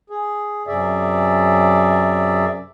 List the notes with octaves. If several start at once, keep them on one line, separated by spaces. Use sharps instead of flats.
G#4
F#2 C3 G#4 D5 E5